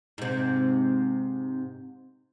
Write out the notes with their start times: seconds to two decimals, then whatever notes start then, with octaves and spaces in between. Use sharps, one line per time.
0.18 G#2 C3